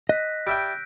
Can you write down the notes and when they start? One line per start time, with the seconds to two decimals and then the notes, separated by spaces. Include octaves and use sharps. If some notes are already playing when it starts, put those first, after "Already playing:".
0.09 D#5 F#6 A#6 B6
0.47 G3 E5 G5 E6 G6 D7